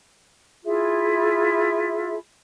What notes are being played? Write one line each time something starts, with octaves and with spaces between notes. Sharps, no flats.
E4 F4 G#4 E5